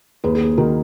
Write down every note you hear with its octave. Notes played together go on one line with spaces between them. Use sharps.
D#2 G#4 B4
G#4
D#2
D#3 F#4 A#4